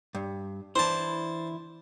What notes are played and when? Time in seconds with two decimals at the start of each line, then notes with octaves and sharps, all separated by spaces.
0.15 G2
0.76 E3 D4 E4 C5 A5 C6